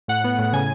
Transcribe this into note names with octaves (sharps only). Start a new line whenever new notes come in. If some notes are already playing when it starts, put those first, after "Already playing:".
A2 F#5
B3
A2
C#3 G#5